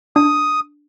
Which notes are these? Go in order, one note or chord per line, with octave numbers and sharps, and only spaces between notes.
D4 D#6